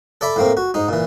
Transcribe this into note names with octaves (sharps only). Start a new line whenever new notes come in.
A4 D5 E5 B5
A2 A#3 C4
F#4
G#2 D#4
A#2 E3